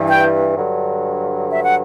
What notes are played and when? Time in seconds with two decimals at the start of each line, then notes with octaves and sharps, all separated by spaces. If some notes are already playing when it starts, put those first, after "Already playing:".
Already playing: G2 E3
0.08 G5
0.56 G2 D3 F#3
1.51 E5
1.63 F#5